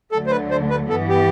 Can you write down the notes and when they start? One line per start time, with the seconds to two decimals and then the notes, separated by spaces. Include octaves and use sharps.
0.11 D2 D3 F#3 A3 A4
0.26 C5
0.31 B4
0.51 C5
0.70 B4
0.89 G2 E3 B3 A4
1.09 G4